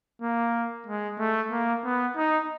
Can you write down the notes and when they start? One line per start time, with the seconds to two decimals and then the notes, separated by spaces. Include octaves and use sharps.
0.22 A#3
0.87 G#3
1.19 A3
1.51 A#3
1.84 B3
2.16 D#4